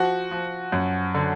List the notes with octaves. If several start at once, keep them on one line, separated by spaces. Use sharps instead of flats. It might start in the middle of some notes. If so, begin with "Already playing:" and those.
Already playing: F3 F#4
F3
F#2
D3